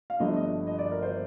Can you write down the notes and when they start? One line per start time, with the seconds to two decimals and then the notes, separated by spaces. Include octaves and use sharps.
0.10 F5
0.20 G1 G2 D3 F3 A3 D#5
0.36 D#5
0.67 D#5
0.79 D5
0.91 A#4
1.03 C5